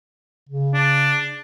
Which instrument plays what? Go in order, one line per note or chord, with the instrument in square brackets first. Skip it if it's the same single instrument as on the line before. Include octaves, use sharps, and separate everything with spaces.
[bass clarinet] C#3
[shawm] D4